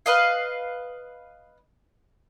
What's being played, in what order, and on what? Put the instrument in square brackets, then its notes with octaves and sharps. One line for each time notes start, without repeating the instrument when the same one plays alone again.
[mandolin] B4 D#5 F5